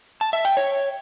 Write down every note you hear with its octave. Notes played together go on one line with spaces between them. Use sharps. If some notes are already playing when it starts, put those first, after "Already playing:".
A5
E5
G5
C#5